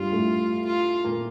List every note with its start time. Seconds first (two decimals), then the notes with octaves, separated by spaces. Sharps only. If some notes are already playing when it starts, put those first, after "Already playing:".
Already playing: G2 G3 F4
0.12 A2 A3
0.67 F4
1.04 A#2 A#3